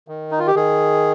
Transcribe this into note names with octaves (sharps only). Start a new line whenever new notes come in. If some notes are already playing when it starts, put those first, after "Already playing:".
D#3
D#4
F4
G4
D#3 G#4